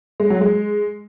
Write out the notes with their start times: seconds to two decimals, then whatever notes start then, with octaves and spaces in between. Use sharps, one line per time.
0.20 G#3
0.30 F#3
0.41 G#3